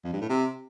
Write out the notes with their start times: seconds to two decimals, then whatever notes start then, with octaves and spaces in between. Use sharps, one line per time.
0.04 F2
0.13 G2
0.21 A2
0.29 C3